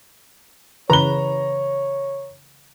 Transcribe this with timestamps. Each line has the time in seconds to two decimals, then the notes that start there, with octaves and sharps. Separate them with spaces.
0.90 C#3 E3 B4 C#5 A#5 G7